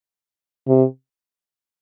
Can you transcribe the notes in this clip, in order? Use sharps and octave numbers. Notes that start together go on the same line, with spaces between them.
C3